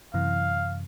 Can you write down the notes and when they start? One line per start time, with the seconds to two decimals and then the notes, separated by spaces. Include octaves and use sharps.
0.14 F#2 C3 E3 F5